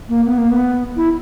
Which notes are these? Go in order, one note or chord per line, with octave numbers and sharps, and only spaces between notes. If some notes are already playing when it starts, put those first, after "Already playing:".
A#3
B3
A#3
B3
E4